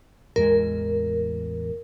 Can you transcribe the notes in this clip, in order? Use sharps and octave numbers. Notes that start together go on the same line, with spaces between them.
A1 E2 G#3 A#4